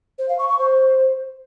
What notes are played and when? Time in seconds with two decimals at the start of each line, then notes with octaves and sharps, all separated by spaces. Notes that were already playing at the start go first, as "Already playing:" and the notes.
0.18 C5
0.28 F5
0.39 C#6
0.49 C#6
0.59 C5